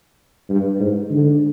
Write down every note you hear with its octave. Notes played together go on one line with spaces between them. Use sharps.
G2
G#2
D3